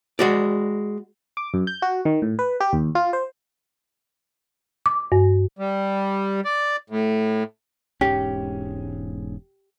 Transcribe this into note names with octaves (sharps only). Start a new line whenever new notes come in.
G#3 F#4 D5
D6
F#2
G6
F#4
D#3
A2
B4
G4
D#2
F4
C5
D6
G2
G3
D5
A2
E1 G#2 C#4 G4